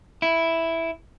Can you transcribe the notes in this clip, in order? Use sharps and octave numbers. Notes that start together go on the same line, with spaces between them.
E4